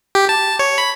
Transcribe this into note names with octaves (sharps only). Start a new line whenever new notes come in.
G4
A5
C#5
B5